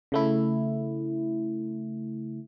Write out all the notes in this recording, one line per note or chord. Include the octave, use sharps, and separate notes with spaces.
C#3 A3 E4